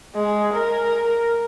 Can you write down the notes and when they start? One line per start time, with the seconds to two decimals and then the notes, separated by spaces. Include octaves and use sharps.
0.16 G#3
0.55 A#4